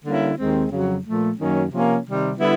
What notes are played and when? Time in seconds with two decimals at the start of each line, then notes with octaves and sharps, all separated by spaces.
0.04 D3 G3 A#3 C#4 E4
0.37 D#2 D#3 G#3 C4
0.71 F2 C#3 F#3
1.05 A#2 F3 A3
1.37 F#2 D#3 F#3 A#3 C#4
1.70 C3 F3 A#3 C#4
2.05 C3 D#3 G3
2.38 D3 G3 B3 E4